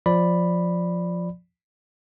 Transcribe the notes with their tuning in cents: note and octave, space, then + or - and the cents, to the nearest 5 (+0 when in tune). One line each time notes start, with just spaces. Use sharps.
F3 +5 D5 +0 B5 +0